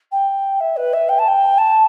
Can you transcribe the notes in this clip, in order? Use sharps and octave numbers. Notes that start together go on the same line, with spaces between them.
G5
E5
B4
E5
G5
A5
G5
A5